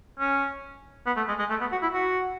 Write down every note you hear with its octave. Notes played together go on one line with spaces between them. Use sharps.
C#4
B3
A3
G#3
G#3
A3
B3
F#4
E4
F#4